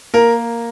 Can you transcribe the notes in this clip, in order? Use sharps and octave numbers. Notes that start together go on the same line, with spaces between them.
A#3 A#4